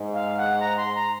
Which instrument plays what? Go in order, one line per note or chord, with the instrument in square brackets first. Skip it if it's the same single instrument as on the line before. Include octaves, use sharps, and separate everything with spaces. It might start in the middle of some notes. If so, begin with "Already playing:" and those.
Already playing: [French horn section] G#2
[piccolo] F5
F#5
A#5
C6
A#5